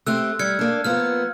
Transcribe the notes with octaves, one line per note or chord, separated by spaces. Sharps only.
A3 C4 G4 E6 F#6
G3 F6 G#6 C#7
A#3 D4
F3 A#3 B3 F6